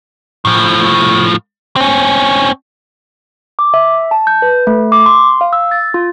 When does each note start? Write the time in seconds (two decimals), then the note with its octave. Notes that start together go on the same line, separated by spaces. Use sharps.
0.45 A2 F3
1.76 C4 C#4
3.59 D6
3.74 E5
4.11 A5
4.27 G6
4.42 B4
4.67 A3
4.92 D6
5.06 C6
5.41 F5
5.53 E6
5.71 A6
5.94 F4